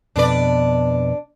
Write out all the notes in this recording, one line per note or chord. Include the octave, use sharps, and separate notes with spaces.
F2 B2 D4 B4 D5